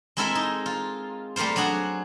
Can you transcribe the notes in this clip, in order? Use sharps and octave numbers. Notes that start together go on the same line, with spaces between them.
G#3 C4 E4 A4 A#4 E5
D#4
F4
G3 A3 A#3 F4 C5
F#3 D4 F#4 G#4 F#5